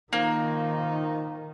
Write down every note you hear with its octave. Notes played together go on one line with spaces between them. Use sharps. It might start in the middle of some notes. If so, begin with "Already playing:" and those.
D#3 F3 A#3 D#4 A#5